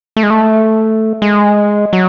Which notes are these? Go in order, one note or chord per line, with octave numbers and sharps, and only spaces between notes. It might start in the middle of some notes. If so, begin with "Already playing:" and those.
A3
G#3
A3
G#3
F#3